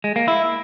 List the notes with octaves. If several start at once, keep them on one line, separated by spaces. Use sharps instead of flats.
G#3
A#3
E4